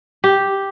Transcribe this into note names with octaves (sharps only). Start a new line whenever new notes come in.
G4